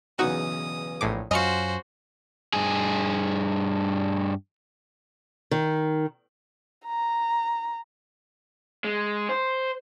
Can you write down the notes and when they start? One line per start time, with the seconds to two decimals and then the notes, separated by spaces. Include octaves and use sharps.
0.19 B1 E2 C#3 D#4 F#4 D#6
1.01 A#1 A2 D6
1.31 F#2 C#4 F4 F#4 C5 D#5 C#7
2.53 G2 G#4
5.51 D#3
6.86 A#5
8.84 G#3
9.29 C5